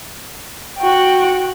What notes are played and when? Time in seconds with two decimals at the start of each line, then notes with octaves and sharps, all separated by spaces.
0.78 F#4 G5